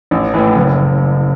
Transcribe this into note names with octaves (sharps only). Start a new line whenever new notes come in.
A1
A2 E3
F#1